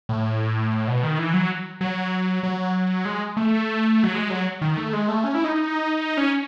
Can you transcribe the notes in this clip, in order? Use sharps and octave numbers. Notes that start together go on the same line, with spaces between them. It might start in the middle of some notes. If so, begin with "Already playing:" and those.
A2
B2
D#3
E3
F#3
F#3
F#3
G#3
A3
F#3
G#3
F#3
D#3
A3
G#3
A3
C#4
E4
D#4
D#4
C#4